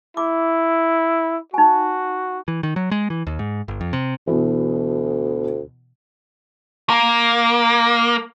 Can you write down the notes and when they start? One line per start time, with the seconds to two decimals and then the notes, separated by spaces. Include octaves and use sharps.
0.17 E4 D6
1.54 D#4 F#4 G#5
2.48 E3
2.63 D#3
2.76 F#3
2.91 G#3
3.10 E3
3.27 D#2
3.39 G#2
3.68 G1
3.81 F2
3.93 C3
4.27 D2 B2 E3
6.90 A#3